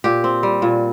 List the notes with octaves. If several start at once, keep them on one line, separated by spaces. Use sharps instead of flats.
A#2 G4
C4
G3
A#2